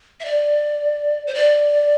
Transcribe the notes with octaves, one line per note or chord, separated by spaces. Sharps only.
E5
D5
C5
D5